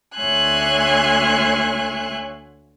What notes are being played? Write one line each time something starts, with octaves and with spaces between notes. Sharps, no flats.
D2 C#5 E5 G#5 C6 F#6